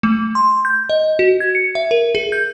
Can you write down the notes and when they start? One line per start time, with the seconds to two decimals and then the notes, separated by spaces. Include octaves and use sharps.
0.03 A3
0.35 C6
0.65 G6
0.89 D#5
1.19 F#4
1.40 G#6
1.55 C#7
1.75 E5
1.91 A#4
2.15 G#4
2.32 G6